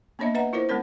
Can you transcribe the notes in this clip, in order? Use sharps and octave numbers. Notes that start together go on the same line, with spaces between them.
A#3 B3 D4 C#5 D#5 E5
B4 D#5 E5 F#5 A#5
E4 F4 A#4 C5 C#5
G#3 B3 C#4 A#4 C#5